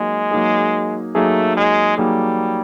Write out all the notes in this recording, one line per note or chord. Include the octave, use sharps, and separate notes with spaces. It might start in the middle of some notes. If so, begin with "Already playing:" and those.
Already playing: F#3 G#3 A#3 D#4
F#3 A#3 D#4 G#4
F#3 A3 A#3 D#4 G#4
G#3
F#3 G3 A#3 D#4 G#4